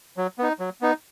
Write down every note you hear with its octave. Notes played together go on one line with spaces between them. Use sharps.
F#3
B3 D#4
F#3
B3 D#4